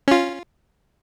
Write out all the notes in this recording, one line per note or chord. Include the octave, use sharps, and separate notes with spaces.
C#4 F4